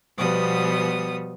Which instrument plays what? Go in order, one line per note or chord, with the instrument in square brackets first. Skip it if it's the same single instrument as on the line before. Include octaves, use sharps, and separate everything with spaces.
[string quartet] B2 F3 G3 B3 D#6